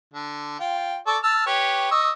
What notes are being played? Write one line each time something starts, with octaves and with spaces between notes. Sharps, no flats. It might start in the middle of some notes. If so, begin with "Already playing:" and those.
D3
F4 G5
A4 D5 C#6
A5 E6 F6
G4 B4 C#5
D#5 C#6 E6